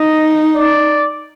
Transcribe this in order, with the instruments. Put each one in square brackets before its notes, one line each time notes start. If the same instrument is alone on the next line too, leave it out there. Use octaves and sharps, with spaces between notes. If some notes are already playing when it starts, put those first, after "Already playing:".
Already playing: [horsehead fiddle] D#4 [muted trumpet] D#5
[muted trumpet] D5